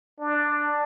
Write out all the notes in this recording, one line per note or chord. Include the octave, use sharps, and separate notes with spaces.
D4